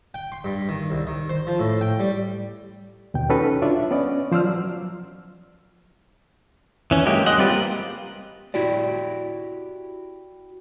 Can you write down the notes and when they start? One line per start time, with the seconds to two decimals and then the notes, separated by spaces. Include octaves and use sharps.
0.14 G5
0.32 C6
0.44 G2
0.69 D#3
0.90 C2
1.07 D#3
1.29 C5
1.47 F3
1.60 A2
1.81 G5
2.00 G3
3.14 D#2 B2 G5
3.30 C#4 D#4 F#4 A4 B4
3.62 D4 F4 C#5 D5 E5
3.91 B3 C#4 D5 D#5
4.32 F3 C5 D5 E6 F6
4.44 F#3
6.91 E3 C#4
7.06 F#3 G#3 A#3 G4
7.26 G#3 D#5 F#5
7.38 G3 C4 F4 G4 B4
7.51 A#3
8.54 E4 F#4 G4 D5